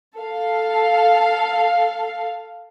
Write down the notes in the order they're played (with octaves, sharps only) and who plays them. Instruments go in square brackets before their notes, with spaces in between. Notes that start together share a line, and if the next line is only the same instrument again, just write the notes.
[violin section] A4 F5